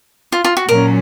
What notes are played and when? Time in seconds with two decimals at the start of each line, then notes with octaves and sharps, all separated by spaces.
0.32 F4
0.44 F4
0.57 F#4
0.69 A#2 F#3 C#4 A#4